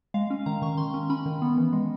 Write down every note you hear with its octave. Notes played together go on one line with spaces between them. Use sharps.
G#3 F5
C#4
D#3 A#5
D#3 C#6
D#3 C6
C#4
C#4 B5
D#3
B3
E3
G#3